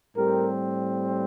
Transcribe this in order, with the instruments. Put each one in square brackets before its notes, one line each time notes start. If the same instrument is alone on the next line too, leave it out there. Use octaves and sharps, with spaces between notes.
[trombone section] A2 G3 C4 G4 A#4